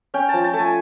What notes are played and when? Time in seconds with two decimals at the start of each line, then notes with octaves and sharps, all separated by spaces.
0.14 C#4 G5
0.29 F3 A5
0.44 A5
0.53 A3
0.59 G#5